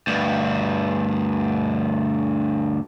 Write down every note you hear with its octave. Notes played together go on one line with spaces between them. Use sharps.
D2 G2